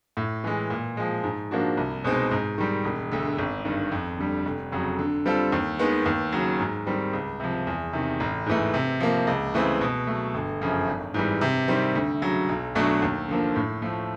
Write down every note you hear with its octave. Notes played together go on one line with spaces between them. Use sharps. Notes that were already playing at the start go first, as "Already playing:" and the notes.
A2
E3 G#3
A#2
F3 G#3
G#2
F3 A#3 D4 F#4
C2
B2 G#3 C4 D#4
G#2
D#3 G3
E1
D2 D3
G#1
G2 D#3
F2
D3 G3
F1
F2 C#3 F#3
D3
G3 C4 F4 A4
D#2
D#3 G#3 B3
D#2
C#3 F#3
G#2
D#3 G3 C4
C#2
C3 F3
E2
C3 D#3
A1
G#2 E3 A3
C3
F3 A#3
C#2
C#3 E3 A3 C4
B2
F#3 A3
G1
F#2 C#3 F3
G#1
G#2 E3 G3
C3
D#3 G3 C4
D2
C#3 F#3
B1
B2 F#3 A3 D4
D#2
D3 F3 A#3
A2
F3 A3